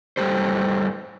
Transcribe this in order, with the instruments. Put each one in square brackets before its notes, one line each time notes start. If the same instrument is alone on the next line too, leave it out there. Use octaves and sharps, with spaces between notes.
[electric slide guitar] G2 B2 G3 A3 G4 C5